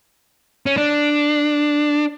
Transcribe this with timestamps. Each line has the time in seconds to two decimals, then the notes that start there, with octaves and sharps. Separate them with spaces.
0.66 C#4
0.77 D4